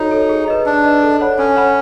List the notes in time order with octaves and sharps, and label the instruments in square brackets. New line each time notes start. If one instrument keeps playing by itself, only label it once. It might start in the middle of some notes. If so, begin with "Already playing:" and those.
Already playing: [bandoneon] D#4 [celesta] F#4 A4 C#5
[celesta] A4 C#5
G#4
B4 D#5
[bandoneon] D4 [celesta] G#4
[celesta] B4 D#5
A4
C#5 F#5 B5
[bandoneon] C#4 [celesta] A4
[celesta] C#5 F#5 B5